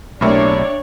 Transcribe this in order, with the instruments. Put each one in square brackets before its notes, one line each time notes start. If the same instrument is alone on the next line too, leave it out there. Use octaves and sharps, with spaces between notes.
[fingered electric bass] B1 [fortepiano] A2 C3 A#3 [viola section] D4 C#5 D5